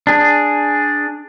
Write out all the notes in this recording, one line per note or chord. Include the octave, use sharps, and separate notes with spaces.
D4 G#4